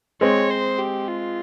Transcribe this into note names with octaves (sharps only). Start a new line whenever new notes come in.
G#3 C4 C#5
C5
G4
F4